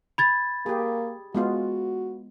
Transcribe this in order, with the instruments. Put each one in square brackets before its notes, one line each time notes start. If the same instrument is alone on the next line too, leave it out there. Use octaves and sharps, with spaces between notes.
[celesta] B5 G#6 A6
[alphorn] A#3 [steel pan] G4 G#4
[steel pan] G#3 B3 F4 [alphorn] F#4